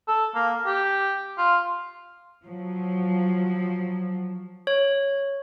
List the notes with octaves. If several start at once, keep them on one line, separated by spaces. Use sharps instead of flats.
A4
A#3
G4
F4
F3 F#3
C#5